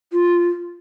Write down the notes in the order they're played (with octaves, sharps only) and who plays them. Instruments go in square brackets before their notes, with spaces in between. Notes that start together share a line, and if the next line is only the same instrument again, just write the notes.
[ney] F4